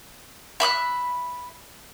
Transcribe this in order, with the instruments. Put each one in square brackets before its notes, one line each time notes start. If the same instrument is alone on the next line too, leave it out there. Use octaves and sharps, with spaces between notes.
[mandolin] E5 B5 D6 F#6